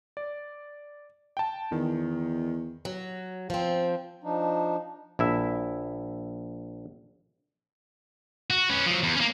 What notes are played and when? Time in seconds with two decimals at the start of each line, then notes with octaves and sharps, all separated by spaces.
0.17 D5
1.37 G5 A5
1.72 E2 D#3
2.85 F#3
3.50 F3 C4
4.24 F3 D4 D#4
5.19 A#1 E4 E5
8.50 F#4
8.70 C#4 B4
8.86 F3 F#3
9.03 E2
9.16 A#3 C#4